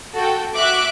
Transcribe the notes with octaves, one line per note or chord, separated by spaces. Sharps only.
F#4 A4 G5
F#4 E5 D6 F#6 D7